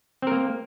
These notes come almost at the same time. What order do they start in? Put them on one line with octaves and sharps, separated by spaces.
C4 A#4 A#3